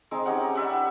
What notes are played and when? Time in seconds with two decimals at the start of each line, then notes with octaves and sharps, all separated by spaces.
0.11 G#3 C4 D#4
0.25 C#4 D#4 G4 F#5
0.55 G3 E5 F#5
0.70 B4 E5